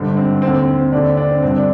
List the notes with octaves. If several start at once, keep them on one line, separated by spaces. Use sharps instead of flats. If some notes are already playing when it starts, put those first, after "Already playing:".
Already playing: G#1 G2 D3
C4
D#2 C4
D3
C4
C4
D#2 D3 D4
C4
D4
C4
G1 G2 D3 C4
D4